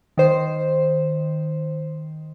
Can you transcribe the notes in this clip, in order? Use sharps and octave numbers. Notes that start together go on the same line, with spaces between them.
D#3 C5